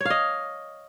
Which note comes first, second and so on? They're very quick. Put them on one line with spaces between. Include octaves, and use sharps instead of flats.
C#5 F5 D#5